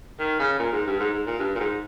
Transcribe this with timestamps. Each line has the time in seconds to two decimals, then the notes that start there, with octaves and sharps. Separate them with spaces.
0.19 D#3
0.39 C#3
0.59 A#2
0.72 G#2
0.86 G2
1.00 G#2
1.13 G#2
1.26 A#2
1.39 G2
1.55 A#2
1.60 G#2